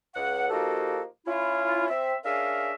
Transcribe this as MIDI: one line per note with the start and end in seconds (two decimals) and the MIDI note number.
0.14 0.49 37
0.14 0.49 78
0.50 1.04 53
0.50 1.04 58
0.50 1.04 63
0.50 1.04 66
0.50 1.04 67
0.50 1.04 69
1.27 1.88 61
1.27 1.88 64
1.27 1.88 65
1.89 2.12 60
1.89 2.12 76
2.25 2.72 61
2.25 2.72 62
2.25 2.72 68
2.25 2.72 70
2.25 2.72 76
2.25 2.72 77